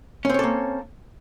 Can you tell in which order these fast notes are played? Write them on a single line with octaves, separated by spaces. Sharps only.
C#4 C4 C#5 A4 A#3